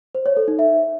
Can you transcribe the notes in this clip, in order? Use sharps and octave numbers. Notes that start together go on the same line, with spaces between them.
C5
C#5
A4
D#4
E5